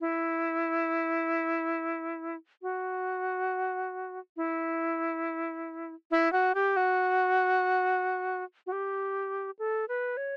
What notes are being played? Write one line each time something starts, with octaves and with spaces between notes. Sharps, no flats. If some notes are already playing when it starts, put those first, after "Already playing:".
E4
F#4
E4
E4
F#4
G4
F#4
F#4
G4
A4
B4
C#5